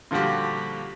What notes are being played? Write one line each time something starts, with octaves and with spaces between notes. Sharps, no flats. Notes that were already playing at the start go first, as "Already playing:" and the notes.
A#2 D3 F3 G3 F#4 G4